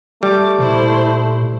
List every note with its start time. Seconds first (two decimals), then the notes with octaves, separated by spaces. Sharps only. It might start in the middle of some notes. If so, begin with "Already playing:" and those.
0.23 G3 A3 D6
0.59 A#2 E4 C5